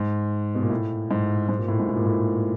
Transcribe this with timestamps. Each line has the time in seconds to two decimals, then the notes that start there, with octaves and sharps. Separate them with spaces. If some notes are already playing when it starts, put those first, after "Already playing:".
Already playing: G#2
0.55 B2
0.62 A#2
0.70 A2
1.11 G#2
1.49 G#2
1.59 A#2
1.68 A2
1.79 G#2
1.89 A2
1.96 A#2
2.06 A2